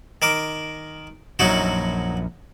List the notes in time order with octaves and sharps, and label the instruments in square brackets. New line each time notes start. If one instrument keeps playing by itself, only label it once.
[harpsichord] D#3 A#4 D6
[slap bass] A#1 F#2 A#2 [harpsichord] F#3 D#4 F#4